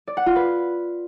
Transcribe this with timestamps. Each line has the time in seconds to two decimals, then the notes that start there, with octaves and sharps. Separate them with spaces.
0.08 D5
0.17 F#5
0.26 F4
0.36 B4